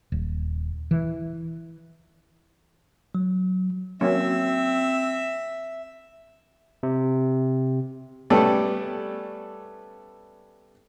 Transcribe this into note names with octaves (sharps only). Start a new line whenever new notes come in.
D#1
E3
F#3
F#3 A#3 C4 C#4 E5
C3
G3 A3 B3 C#4 A4 D5